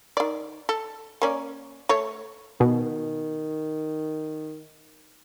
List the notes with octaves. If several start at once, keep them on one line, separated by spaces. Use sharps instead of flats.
D#3 D5
A4
A#3 C#4 D5
A3 C#5
B2 D#3